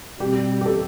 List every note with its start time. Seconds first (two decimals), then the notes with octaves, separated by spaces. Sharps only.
0.19 B2 G3 C4 G4
0.61 G4
0.66 A4